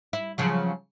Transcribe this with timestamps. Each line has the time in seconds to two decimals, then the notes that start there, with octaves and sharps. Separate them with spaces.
0.13 E4
0.38 C#3 F3 F#3